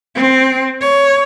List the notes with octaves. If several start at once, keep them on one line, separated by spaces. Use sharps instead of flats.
C4
C#5